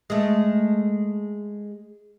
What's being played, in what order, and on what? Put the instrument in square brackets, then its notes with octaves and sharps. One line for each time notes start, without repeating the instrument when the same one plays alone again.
[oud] G#3 A3